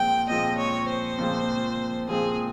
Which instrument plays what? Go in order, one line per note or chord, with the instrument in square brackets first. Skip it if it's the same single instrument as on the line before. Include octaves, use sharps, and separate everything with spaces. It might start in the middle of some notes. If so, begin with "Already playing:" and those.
Already playing: [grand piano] A#2 F3 G#3 C4 [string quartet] G5
[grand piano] A#2 F3 G#3 C4 [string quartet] D#5
[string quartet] C#5
C5
[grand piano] A#2 F3 G#3 C4
[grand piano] A#2 F3 G#3 C4 [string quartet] G#4